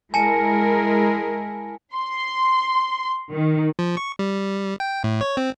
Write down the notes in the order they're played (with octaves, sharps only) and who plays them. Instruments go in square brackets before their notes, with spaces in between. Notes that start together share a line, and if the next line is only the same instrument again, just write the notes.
[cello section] G#3 E4 A#4 [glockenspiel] G#5 A5 C#7
[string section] C6
D#3
[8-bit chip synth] F3
C#6
G3
G5
A2
C#5
C4